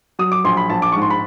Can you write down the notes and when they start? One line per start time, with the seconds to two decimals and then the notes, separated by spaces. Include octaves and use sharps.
0.19 F#3 D#6
0.32 D6
0.44 A#1 C6
0.57 B5
0.70 A#1 A5
0.82 D6
0.92 G#2 C#6
1.02 C6
1.10 B5